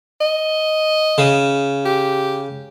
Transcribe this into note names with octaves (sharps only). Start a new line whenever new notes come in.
D#5
C#3
G4